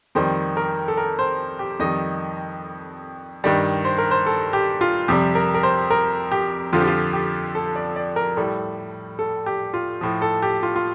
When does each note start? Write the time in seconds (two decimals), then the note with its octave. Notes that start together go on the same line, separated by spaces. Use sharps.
0.15 F2 D#3 G3 C5
0.57 A#4
0.88 A4
0.97 A#4
1.19 C5
1.59 G4
1.79 F2 D#3 G3 D#5
3.44 G2 D#3 G3
3.85 C5
3.98 A#4
4.11 C5
4.26 A4
4.53 G4
4.81 F4
5.08 F2 C3 G3 G4
5.35 A#4
5.54 A#4
5.63 C5
5.91 A#4
6.32 G4
6.72 F2 D3 F3 F4
6.80 G4
6.87 F4
7.13 G4
7.55 A4
7.76 D5
7.96 D5
8.16 A#4
8.36 A2 G3 A4
9.19 A4
9.46 G4
9.74 F4
10.01 A2 F3
10.22 A4
10.43 G4
10.63 F4
10.76 F4